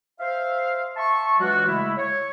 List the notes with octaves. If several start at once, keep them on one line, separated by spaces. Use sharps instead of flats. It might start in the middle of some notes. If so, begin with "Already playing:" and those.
C5 E5 F5
E5 A5 C6 C#6
E3 F#3 G#3 D4 F4 F#4
C#3 G#3 A3 E4
C#5